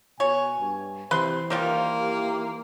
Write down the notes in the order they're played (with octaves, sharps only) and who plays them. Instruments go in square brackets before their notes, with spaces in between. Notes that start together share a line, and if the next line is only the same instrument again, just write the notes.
[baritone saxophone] B2 [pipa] C#5 [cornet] G#5
[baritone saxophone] G2
[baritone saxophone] C3 [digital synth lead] E3 [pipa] B4 C6 [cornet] C5
[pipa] D#3 G3 F4 [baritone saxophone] A#3
[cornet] G4